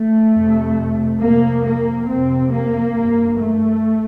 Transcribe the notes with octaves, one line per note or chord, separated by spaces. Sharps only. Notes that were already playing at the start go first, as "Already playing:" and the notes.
Already playing: A3
F2 C3
F2 C3 A#3
A#3
F2 C3 C4
A#3
G2
A3